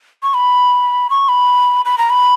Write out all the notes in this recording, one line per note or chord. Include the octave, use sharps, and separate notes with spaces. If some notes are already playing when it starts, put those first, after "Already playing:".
C#6
B5
C#6
B5
B5
A#5
B5